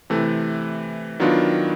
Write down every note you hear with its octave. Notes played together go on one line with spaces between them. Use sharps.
C3 E3 A3
D#3 F#3 B3 D4 F4